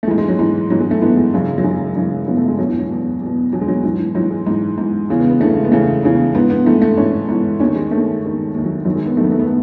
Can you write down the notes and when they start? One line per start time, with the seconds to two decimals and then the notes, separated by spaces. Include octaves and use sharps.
0.03 A3
0.07 E3 G#3
0.11 G#2
0.18 G#3
0.28 F#3
0.39 G#2 E3
0.70 G#2 E3 F#3
0.80 G#3
0.91 A3
1.01 G#2 E3 B3
1.17 G#3
1.33 F#2 C#3 E3
1.58 F#3
1.64 F#2 C#3 E3 G#3
1.96 F#2 C#3 E3
2.27 F#2 C#3 E3 B3
2.37 A3
2.48 G#3
2.58 E2 B2 F#3
2.69 E3
2.79 F#3
2.90 E2 B2
3.21 E2 B2
3.52 E2 B2 F#3
3.61 G#3
3.68 F#3
3.84 G#2 E3 F#3
3.99 E3
4.15 G#2 E3 F#3
4.30 G#3
4.46 G#2 E3 D#4
4.78 G#2 E3
5.09 E2 C#3 E3
5.19 B3
5.30 B3
5.40 E2 C#3 E3 A3
5.56 G#3
5.65 B3
5.72 E2 C#3 E3 A3
6.03 E2 C#3 E3
6.35 G#2 E3 B3
6.50 B3
6.66 G#2 E3 A3
6.82 A3
6.97 G#2 E3 C#4
7.29 G#2 E3
7.60 D#2 D#3 C#4
7.76 G#3
7.91 D#2 D#3 A3
8.23 D#2 D#3
8.54 D#2 D#3
8.64 F#3
8.85 F#2 D#3 F#3
8.96 G#3
9.06 B3
9.17 D#3 A3
9.21 F#2 B3
9.32 A3
9.39 B3
9.46 A3